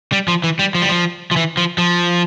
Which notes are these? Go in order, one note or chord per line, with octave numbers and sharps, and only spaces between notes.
G3
F3
E3
G3
F3
G3
F3
F3
E3
F3
F3